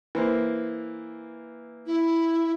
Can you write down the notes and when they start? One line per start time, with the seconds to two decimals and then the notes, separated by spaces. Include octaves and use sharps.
0.15 E3 A#3 C5
1.86 E4